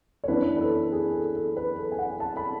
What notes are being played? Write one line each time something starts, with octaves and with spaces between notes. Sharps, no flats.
C#5
F#2 E3 B3 D4 B4
B4
A4
G#4
A4
A4
B4
A4
G#5
F#5
A5
B5